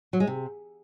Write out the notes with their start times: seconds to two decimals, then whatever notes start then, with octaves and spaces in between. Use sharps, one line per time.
0.13 F#3
0.20 G#3
0.27 C3